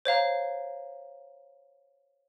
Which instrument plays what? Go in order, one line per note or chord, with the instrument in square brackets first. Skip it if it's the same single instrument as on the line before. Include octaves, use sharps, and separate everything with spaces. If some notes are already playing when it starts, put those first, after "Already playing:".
[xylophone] C5 C#5 F5 A#5